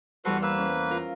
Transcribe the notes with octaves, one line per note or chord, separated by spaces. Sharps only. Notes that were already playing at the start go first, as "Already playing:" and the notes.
E2 G3 F#4 A4 B4 C5
A#3 B4 E6
C#4
F4 A#4